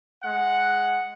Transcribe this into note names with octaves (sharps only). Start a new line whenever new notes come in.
G#3 F#5